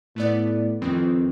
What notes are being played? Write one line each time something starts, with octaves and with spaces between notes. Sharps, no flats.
A2 A3 B3 D5
F2 D#3 E3 C4